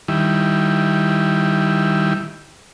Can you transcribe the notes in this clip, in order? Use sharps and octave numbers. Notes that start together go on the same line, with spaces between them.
D#3 G3 E4